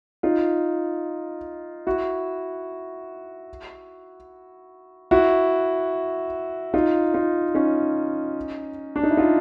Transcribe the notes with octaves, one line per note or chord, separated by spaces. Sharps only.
D#4 F4
E4 F#4
E4 F#4
D#4 F4
D#4 F4
C#4 D#4
D4
D#4
E4
D#4 F4